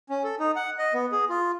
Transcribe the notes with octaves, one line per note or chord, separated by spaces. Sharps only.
C#4
A4
D#4
F#5
D#5
B3
G#4
F4